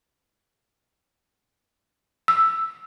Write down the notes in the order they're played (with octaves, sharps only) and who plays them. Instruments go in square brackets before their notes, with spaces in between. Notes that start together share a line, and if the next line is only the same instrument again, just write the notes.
[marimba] E6